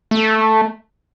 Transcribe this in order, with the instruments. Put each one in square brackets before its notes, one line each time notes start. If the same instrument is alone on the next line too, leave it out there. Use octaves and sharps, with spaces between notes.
[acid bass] A3